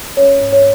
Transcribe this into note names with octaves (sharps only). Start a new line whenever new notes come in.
C#4 C#5
G#2
C#5